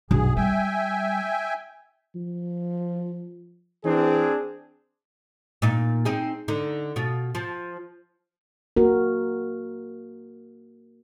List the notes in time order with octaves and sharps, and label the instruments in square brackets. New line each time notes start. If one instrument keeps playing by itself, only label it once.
[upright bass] B1 G2 [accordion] G#4
[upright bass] G3 [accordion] E5 G5 G#5
[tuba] F3
[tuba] E3 [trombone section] C4 D4 G#4
[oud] A#2 D#4
C4 D#4 G#4
D3 D#4
B2 F4
F3
[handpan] A#3 F#4 A#4